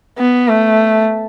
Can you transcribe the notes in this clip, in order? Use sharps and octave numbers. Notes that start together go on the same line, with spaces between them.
B3
A3